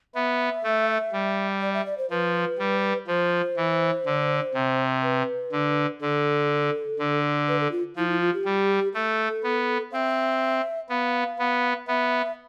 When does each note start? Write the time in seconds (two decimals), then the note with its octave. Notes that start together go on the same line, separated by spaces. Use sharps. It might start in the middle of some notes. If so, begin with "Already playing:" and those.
0.15 B3 E5
0.64 A3
1.12 G3
1.61 D5
1.74 E5
1.86 D5
1.98 C5
2.10 F3 B4
2.58 G3
3.07 F3 C5
3.57 E3
4.06 D3
4.54 C3
5.03 B4
5.52 D3
6.01 D3 A4
6.99 D3
7.48 B4
7.60 A4
7.72 F4
7.96 F3 E4
8.09 E4
8.21 F4
8.33 G4
8.45 G3
8.94 A3 A4
9.43 B3
9.92 C4 E5 F5
10.89 B3 F5
11.39 B3
11.87 B3 E5